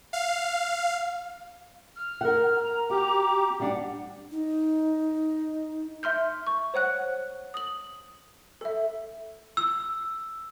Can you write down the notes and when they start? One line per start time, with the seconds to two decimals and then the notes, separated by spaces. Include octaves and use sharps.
0.13 F5
1.96 F6
2.21 A#4 F#5
2.63 A#5
2.90 F#4 G4
3.60 G3 D4 F#5
4.31 D#4
6.03 E5 C6 F6 G6
6.47 C#6
6.74 C5 C#5 F#5 F#6
7.54 D#6 F#7
8.61 A4 E5
9.57 E6